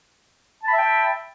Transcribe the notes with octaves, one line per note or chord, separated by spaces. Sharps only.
E5 G5 A5 B5